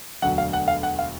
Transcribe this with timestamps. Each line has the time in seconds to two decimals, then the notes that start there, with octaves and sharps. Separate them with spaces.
0.22 E1 D2 D3 F#3 F#5
0.38 F5
0.53 F#5
0.68 F5
0.83 F#5
0.99 F5